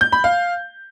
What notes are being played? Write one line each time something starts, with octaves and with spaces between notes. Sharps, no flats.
G6
B5
F5